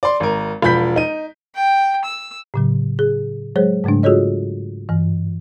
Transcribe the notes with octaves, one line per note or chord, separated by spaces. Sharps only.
D5 C6
G#1 A#4
E1 F3 B5 G6 B6
D#4 D#7
G5
E6
A2 C#3 F#3
G#4
F#3 G#3 G#4 C5 C#5
G#2 C#3 G#3 A3 D4
F4 F#4 G#4 A4 C#5 D#5
G2 E3